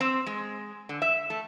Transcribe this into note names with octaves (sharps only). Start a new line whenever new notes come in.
C4
G#3
D3
E5
A3